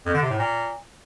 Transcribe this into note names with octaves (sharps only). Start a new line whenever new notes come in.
F2
D3
C3
A2
A#2